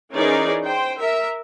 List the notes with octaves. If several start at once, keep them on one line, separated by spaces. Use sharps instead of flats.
E3 C#4 D#4 G#4 A#4 D5
C5 G5
A#4 E5